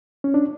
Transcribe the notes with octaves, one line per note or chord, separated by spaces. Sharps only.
C#4
D4